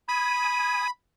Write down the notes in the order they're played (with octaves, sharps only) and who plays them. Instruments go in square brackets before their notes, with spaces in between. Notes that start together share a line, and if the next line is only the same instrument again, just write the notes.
[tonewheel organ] G#5 D#6 [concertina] B5